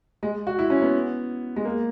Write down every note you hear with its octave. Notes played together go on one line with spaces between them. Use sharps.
G#3
F#4
E4
C#4
B3
G#3
A#3